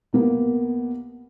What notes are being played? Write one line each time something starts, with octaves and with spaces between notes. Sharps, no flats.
C2 A#3 B3